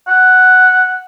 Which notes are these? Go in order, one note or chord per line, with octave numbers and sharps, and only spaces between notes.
F#5